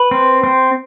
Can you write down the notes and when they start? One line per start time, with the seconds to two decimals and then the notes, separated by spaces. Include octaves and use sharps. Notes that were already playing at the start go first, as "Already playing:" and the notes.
Already playing: B4
0.11 C4
0.44 C4